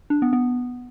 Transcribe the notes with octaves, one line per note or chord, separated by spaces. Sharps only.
D4
B3
B3